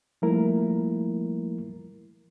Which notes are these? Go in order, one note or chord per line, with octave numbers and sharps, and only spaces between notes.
F3 G3 A3 A#3 E4 A#4